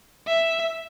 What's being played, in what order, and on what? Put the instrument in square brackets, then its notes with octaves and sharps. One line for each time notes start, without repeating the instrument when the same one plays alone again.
[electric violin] E5